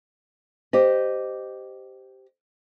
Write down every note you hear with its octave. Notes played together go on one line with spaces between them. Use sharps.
G4 C5 D#5